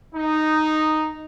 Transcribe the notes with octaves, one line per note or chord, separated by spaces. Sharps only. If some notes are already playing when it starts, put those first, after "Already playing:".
D#4